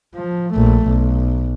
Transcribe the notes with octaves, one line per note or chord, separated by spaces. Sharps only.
F3
A#1 A3
B1